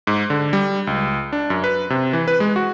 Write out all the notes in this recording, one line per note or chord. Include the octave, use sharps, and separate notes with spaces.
G#2
D3
G3
C#2
D4
F#2
B4
C3
E3
B4
G#3
F#4